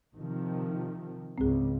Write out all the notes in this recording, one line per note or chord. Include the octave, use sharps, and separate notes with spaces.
C3 D#3 F3
C#2 G#2 C4 G#4